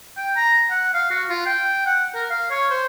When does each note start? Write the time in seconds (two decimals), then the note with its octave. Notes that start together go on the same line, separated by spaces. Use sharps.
0.17 G5
0.36 A#5
0.70 F#5
0.94 F5
1.11 F#4
1.29 F4
1.46 G5
1.86 F#5
2.15 A#4
2.30 F5
2.51 C#5
2.70 C5